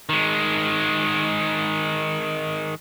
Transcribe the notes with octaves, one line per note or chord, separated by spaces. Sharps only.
D#3 G#3